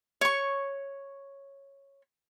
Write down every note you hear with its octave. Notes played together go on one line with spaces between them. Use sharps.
C#5 C#6